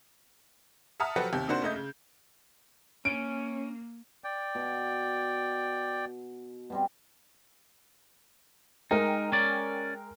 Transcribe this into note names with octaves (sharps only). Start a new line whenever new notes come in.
E5 F#5 A5 A#5 D#6 F6
F3 F#3 F#4 G4 A4 B4
D#2 C3 G4 G6
C3 D#3 A#3 D4 F#4 C5
F#1 C#3 A3 D#5 G6
C#3
A#3 C#4 D7
D5 G5
B2
B2 G3 C4
G#3 D#4 A#4 G5
C#4 D5